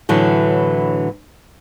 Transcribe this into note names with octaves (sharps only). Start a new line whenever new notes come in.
A2 D3 E3 F#3